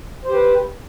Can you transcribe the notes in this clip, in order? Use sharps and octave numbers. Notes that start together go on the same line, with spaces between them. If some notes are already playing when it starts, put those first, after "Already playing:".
G4 B4 C5